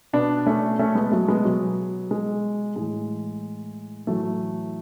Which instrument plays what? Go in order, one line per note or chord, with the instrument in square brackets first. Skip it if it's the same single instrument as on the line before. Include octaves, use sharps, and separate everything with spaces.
[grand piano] B2 B3 D4
A3 C#4
A3 C#4
G#3 B3
F#3 A3
G#3 B3
B2 F#3
G#3
A2 E3 G#3
A2 E3 F#3 A3